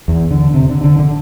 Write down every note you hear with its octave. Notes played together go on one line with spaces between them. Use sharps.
E2
D3
C3
D3
D3
D3